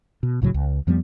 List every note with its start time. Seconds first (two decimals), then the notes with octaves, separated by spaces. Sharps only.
0.23 B2
0.42 C2 A2 C#3 F#3
0.54 C#2
0.87 F2 F3 G3 B3